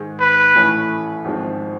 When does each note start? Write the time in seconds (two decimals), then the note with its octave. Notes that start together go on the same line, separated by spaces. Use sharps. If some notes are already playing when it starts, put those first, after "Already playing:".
Already playing: G#2 D#3 G#3
0.20 B4
0.55 A1 A2 E3 A3 C#4
1.25 G#1 G#2 F3 G#3 C4